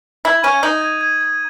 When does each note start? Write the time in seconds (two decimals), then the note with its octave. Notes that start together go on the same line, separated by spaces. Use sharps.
0.25 E4 G#6
0.44 C#4 D#7
0.63 D#4 F#7
0.82 G#6
1.01 G#6
1.21 G#6